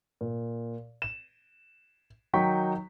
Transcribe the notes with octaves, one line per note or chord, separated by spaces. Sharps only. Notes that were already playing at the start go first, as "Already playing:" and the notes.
A#2
E7
D#3 F#3 D#4 G5 C#6 B6